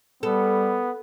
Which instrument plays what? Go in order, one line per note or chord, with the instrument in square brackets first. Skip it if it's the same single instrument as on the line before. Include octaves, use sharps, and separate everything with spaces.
[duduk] G3 [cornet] B3 [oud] A4